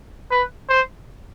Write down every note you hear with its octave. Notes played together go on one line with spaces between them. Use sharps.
B4
C5